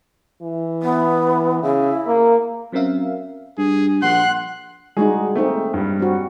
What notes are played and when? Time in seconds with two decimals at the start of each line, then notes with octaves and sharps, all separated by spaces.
0.42 E3
0.83 B3
1.63 C#3 E4
2.07 A#3
2.72 F#3 C4 C#4 A#4 E5 F5
3.58 G2 G#4
4.02 A#1 F#5 C6 F#6
4.97 G3 G#3 D#4 F#4 G#4
5.35 A3 A#3 C4 D#4
5.74 G2 G3
6.00 C4 F#4